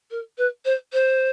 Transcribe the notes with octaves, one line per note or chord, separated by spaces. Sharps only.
A#4
B4
C5
C5